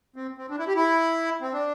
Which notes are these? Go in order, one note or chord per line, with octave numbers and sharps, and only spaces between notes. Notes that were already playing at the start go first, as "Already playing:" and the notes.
C4
C4
D4
E4
G4
E4
C4
D4